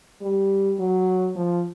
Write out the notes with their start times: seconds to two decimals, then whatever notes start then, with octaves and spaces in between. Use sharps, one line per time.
0.22 G3
0.79 F#3
1.36 F3